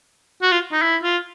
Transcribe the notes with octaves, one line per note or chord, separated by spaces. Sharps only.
F#4
F4
D#4
E4
F4